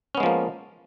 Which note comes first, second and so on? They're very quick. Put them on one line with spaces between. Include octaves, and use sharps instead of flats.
C#4 B3 G#3 F3 A#3